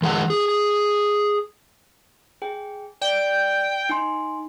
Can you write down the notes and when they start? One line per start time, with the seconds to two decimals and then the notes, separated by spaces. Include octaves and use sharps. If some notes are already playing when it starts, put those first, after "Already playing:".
0.02 D#3 G#3 E5 F#5
0.30 G#4
2.42 G#4 G5
3.01 D5 G5
3.89 D#4 G#5 C6